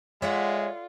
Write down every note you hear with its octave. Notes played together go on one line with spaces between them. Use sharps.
G#3 F4 A4 C#5 D5 E5 F#5